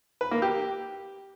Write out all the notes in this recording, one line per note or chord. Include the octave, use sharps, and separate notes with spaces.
B4
A#3
G4